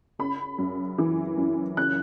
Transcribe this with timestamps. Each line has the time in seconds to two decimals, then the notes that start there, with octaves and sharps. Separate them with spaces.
0.19 C#3 B5
0.58 F#2
0.98 E3
1.37 F#2
1.77 C#3 F#6